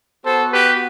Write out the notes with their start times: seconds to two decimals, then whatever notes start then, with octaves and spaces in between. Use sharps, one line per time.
0.24 B3 F#4 A4 C5
0.53 G4 B4